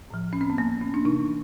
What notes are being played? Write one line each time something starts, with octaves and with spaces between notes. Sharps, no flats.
A2 F3
C#4
C4
B3
A#3
C#4
D4
C3 E3 D#4